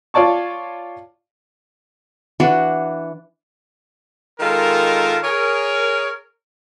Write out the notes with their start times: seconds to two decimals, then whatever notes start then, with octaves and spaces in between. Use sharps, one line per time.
0.14 F4 C#5 D5 A5 C#6
2.40 E3 D4 F#4
4.40 D#3 G#3 F4 A4 A#4
5.23 G#4 A#4 C#5